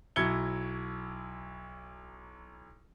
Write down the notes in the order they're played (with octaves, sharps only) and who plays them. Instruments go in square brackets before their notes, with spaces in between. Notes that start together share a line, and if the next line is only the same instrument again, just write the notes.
[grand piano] B1 F#3 E4 G#6 C#7 G7